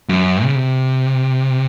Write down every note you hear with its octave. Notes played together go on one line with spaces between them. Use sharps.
F#2
C#3
C3